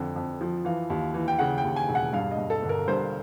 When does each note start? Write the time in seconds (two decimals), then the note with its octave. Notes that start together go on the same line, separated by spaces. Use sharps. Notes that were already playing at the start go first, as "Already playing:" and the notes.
Already playing: F2 D3
0.16 F2
0.41 F3
0.65 E3 F5
0.90 D#2
1.14 E3
1.28 G5
1.39 C#3 F#5
1.58 G5
1.64 D#2
1.76 G#5
1.89 E1
1.95 F#5
2.13 G2 F5
2.31 D#5
2.37 G2
2.50 A4
2.62 G1
2.69 A#4
2.88 G2 C5